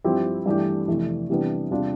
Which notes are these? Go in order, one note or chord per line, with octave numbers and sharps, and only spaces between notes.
G2 F3 C4 E4 G4
G2 E3 A3 D4 G4
F2 C3 E3 A3
C3 E3 G3 B3 D4
E2 C3 G3 D4 F4